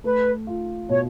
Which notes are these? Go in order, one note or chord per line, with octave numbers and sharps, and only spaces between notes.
A3 B4
F4
B2 C#5